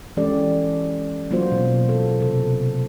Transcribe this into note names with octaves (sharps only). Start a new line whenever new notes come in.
E3 G#3 C#4 G4 A4 D5
F#3 A#3 F4 F#4 C5
B2
A4
C3 A4